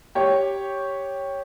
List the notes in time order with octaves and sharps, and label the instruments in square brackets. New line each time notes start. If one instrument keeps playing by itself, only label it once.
[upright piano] G4 C#5